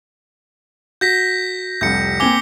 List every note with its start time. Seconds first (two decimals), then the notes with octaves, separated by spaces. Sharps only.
1.01 F#4 G6 A#6 B6
1.81 F1 C2 G6 C#7
2.20 A#3 C4 G#5 D6 G7